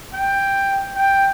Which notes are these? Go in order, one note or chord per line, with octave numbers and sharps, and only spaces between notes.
G5
G5